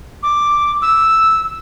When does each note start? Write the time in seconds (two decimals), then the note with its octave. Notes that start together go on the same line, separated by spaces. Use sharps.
0.23 D6
0.82 E6